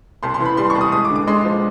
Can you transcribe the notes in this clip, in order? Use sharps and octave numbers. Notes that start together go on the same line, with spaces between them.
C2 C6
C6
E3
B5
G3 C6
C#6
C2
D#6
G#3 D#6
D6
D3
D6
G#3 C6
F3